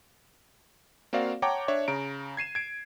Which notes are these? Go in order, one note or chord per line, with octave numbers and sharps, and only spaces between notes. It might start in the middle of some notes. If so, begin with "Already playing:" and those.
A#3 C4 F#4 D5 F5
C#5 F#5 G5 A5 A#5 D6
D4 C#5 E5 C#6
C#3 A#5 D7
G#6 C7 D#7 E7
G#6 D7